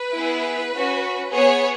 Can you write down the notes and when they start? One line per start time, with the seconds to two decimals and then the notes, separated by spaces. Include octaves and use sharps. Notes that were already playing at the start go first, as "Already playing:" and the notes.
Already playing: B4
0.13 B3 E4 G#4
0.72 C#4 F#4
1.31 B3 G#4 C#5